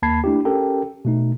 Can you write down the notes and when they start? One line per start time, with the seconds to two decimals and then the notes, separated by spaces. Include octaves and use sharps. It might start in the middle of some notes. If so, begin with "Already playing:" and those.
0.02 D#2 A#3 A5 B5 G#6 C7
0.24 A3 D4 E4 G4
0.45 C#4 G4 A4 A#4 G5
1.05 B2 A3 D#4